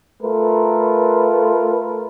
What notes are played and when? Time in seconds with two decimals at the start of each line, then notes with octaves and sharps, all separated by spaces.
0.23 A3 F4 A#4 B4